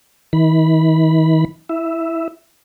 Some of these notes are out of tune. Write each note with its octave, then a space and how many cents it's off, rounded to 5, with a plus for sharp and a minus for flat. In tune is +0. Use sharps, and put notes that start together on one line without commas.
D#3 +45 B5 -5
E4 +0 E5 +0